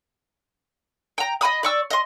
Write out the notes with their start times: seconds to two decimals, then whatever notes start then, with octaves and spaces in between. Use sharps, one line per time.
1.18 G5 A#5
1.41 D#5 G#5 B5 D#6
1.63 D5 C#6 E6
1.90 D#5 C6